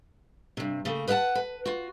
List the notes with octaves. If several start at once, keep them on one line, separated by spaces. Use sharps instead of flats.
G2 C3
C#3 A3 A#3
B4 D#5 F5 F#5 A5
B4
F4 F#4